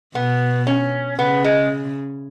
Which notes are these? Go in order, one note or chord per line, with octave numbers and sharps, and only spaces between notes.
B2 B3
C#4
C#3 B3
G#3